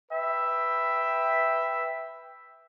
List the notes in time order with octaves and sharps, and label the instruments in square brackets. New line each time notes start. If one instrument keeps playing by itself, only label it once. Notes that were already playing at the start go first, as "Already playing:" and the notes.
[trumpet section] B4 E5 G5